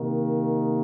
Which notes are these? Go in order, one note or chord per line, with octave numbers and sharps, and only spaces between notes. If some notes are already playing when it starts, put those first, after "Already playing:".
Already playing: C3 D#3 A#3